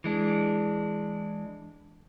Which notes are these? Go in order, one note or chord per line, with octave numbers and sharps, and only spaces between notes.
E3 G#3 D4